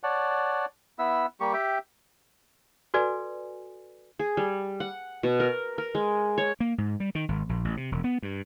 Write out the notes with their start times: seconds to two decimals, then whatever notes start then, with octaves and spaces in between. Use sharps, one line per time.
0.03 C#5 D5 F#5 A5
0.99 B3 E4 E5 E6
1.40 G3 A#3 G4 C#6
1.53 G4 E5 G5
2.94 F#4 A4 B4 D5 G#5
4.19 G#4
4.37 G3
4.80 F#5
5.23 B2
5.40 A#4
5.78 A#4
5.95 G#3
6.38 C#5
6.60 A#3
6.78 G#2
7.00 G3
7.15 D#3
7.29 G#1
7.49 A#1
7.65 A1
7.77 C3
7.92 E1
8.04 B3
8.22 G2